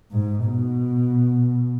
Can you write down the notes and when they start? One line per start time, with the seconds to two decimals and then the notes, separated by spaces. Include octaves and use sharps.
0.11 G#2
0.46 B2